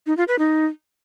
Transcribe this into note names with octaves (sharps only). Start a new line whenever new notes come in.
D#4
F4
B4
D#4